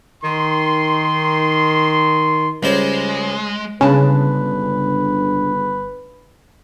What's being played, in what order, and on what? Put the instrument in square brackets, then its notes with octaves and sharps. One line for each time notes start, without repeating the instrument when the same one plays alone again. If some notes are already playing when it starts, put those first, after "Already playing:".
[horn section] D#3 C6
[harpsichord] C#2 G3 C5 [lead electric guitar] G#3
[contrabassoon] G1 [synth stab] C#3 [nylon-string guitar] G#3 D4 A5 [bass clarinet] B4